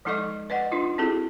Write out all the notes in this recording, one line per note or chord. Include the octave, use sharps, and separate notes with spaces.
F3 G#3 D#4 A4 D#5 C#6
B4 D5 D#5 F#5
D4 D#4 F4
C4 E4 F#4 G#4 A4